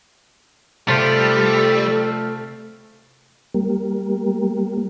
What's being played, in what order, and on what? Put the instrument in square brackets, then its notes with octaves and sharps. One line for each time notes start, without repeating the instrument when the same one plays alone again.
[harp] C3 C5 C6 [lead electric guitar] G3 [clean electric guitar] A3 F4 G4 [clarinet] A4
[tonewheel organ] G3 A#3